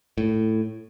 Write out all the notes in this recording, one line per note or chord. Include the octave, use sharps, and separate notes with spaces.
A2